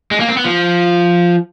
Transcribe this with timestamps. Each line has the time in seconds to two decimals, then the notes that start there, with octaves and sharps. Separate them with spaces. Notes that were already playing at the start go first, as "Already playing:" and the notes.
0.11 G#3
0.20 A#3
0.28 C4
0.37 B3
0.45 F3